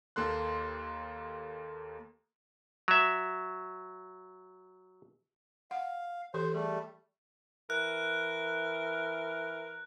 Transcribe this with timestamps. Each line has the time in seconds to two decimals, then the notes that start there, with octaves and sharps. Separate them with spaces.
0.16 D#2 A#3 A4 C6 F#6
2.88 F#3 E5
5.71 F5 F#5
6.34 E3 G4 A4 C5
6.54 G3 A3 G#4
7.70 E3 A#4 F#6